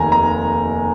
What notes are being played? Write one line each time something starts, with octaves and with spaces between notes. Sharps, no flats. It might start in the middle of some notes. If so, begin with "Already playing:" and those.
Already playing: F1 D#2 D#3 G#5 A#5
A#5